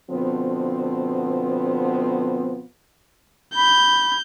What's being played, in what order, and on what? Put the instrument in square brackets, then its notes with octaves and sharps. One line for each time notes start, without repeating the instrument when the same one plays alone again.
[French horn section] B2 D3 F3 B3 C4
[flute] B5 [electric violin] G6